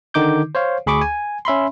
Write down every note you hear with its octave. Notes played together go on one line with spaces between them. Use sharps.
D3 D#3 D#4 D6 G6
C5 C#5 F5
D2 G#4 B5 C#6 D6
G#5
C#4 E5 B5 C6